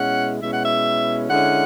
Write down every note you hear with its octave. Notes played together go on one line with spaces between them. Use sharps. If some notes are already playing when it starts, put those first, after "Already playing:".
Already playing: B2 G#3 C#4 E4 F#5
B2 G#3 C#4 E4 E5
F#5
E5
D3 G#3 C#4 E4 F#5